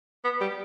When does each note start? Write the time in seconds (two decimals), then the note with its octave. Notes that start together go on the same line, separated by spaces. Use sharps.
0.24 B3
0.41 G3